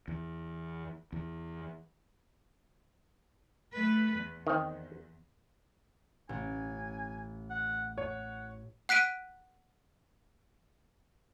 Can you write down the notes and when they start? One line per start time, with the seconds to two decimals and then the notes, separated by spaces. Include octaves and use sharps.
0.08 E2
1.13 E2
3.73 A3 B4
4.16 E2
4.47 D#3 C4
6.29 A1 G#5
7.50 F#5
7.98 C#5 F#5
8.89 F#5 F#6 B6 D7 D#7